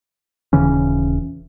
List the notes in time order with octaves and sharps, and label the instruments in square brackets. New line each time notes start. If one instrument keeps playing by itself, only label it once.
[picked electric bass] D#1 C#3 E3 C#4